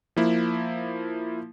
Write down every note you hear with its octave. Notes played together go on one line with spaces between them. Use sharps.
F3 A#3 E4